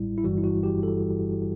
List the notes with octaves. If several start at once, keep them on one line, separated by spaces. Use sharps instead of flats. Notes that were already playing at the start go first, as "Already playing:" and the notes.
Already playing: A1 A2 G3 E4
E4
G1 G2 E3 G3 F#4
E4
F#4
G4
A4